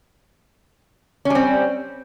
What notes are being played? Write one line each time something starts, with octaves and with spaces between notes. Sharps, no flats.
G3 C4 C#4